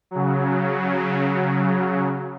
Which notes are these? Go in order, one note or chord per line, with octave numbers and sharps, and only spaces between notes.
C#3 F#3